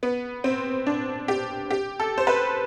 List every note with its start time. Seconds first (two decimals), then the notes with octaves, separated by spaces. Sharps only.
0.03 B3
0.44 C4
0.87 D4
1.28 G4
1.71 G4
2.00 A4
2.18 C5
2.27 B4